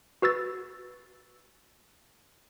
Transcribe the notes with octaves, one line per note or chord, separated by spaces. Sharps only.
F#4 B4 E6 A6